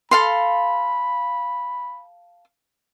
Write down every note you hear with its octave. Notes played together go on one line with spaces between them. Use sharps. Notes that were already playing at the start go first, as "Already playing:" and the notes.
A4 F5 B5 C6